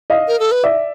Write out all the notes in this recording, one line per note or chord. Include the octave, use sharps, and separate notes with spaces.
D#5 F5
A#4
A4
B4
D5 E5